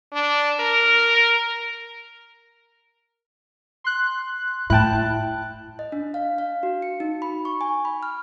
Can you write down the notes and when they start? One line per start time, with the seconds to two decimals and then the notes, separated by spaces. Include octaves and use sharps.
0.13 D4
0.60 A#4
3.84 C6 F#6
4.70 A2 E4 G5 A5 F#6
5.79 D#5
5.92 D4
6.14 F5
6.38 F5
6.63 F#4
6.82 C#7
7.00 D#4
7.22 B5
7.45 C#6
7.61 G#5
7.85 B5
8.03 F6